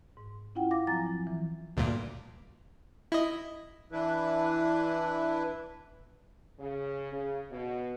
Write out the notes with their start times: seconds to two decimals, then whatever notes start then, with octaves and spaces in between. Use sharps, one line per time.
0.17 G#2
0.55 C#4 E4 F4 F#5 G5
0.71 F5 D6 A#6
0.87 F3 F#3 C4 G#5 A#5 A6
1.06 F3
1.27 E3
1.77 D2 G2 A#2
3.12 E4 D#5
3.92 E3 D4 E4 B4
6.60 C#3
7.12 C#3
7.51 B2